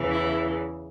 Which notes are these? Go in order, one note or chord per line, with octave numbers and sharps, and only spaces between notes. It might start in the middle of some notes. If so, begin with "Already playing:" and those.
Already playing: E2 C#3 E3
E4